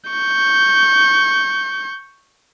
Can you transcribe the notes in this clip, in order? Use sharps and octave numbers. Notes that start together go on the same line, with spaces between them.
C#6 G6